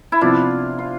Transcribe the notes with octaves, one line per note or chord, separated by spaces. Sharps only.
E4
C3 F3 B3 D4 F4
F4